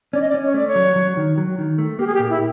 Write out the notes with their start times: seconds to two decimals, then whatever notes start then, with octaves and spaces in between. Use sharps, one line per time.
0.13 C#4 D5
0.21 D#5
0.29 D5
0.34 C#4
0.44 C#5
0.54 A3 D5
0.68 C#5
0.76 F#3
0.96 F#3
1.17 D#3
1.38 F#3
1.58 D#3
1.78 A3
1.99 A#3 G4
2.07 G#4
2.14 G4
2.19 A#2
2.29 E4